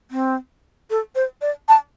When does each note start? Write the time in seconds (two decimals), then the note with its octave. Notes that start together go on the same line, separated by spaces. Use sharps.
0.11 C4
0.90 A4
1.15 C5
1.41 D5
1.68 A5